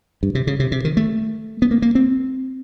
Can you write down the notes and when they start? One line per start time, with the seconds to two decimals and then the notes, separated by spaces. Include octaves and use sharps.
0.23 G2
0.35 C3
0.47 C#3
0.60 C3
0.72 C3
0.85 D#3
0.97 A3
1.62 B3
1.71 A#3
1.82 A#3
1.95 C4